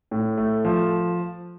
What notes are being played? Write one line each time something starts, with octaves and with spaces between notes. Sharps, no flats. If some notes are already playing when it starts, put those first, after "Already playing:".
A2
A3
F3